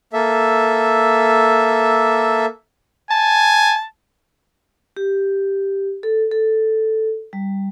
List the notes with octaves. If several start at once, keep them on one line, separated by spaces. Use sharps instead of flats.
A#3 A4 E5
G#5 A5
G4
A4
A4
G3